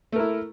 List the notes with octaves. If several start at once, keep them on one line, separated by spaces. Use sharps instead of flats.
A3 E4 A#4